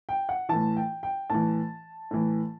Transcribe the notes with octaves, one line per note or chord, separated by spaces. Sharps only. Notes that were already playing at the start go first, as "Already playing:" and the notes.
G5
F#5
A2 E3 A5
G5
G5
A2 E3 A5
A2 E3